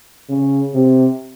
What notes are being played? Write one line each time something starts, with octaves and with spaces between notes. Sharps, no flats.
C#3
C3